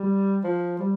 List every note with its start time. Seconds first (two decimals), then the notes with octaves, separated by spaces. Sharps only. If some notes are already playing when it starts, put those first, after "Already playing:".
Already playing: G3
0.44 F3
0.79 G3